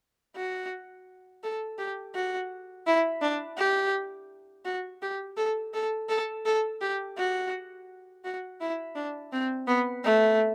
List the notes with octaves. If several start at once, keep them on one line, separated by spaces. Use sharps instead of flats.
F#4
A4
G4
F#4
E4
D4
G4
F#4
G4
A4
A4
A4
A4
G4
F#4
F#4
E4
D4
C4
B3
A3